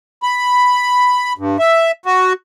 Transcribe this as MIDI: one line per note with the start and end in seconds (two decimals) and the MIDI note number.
0.23 1.33 83
1.38 1.57 43
1.59 1.91 76
2.06 2.33 66